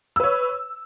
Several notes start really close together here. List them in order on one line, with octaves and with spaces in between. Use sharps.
E6 B4 C#5